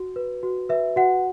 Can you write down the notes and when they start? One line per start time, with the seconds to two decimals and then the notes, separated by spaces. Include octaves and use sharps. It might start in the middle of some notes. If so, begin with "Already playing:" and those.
Already playing: F#4
0.16 B4
0.43 F#4
0.69 B4 E5
0.96 F#4 F#5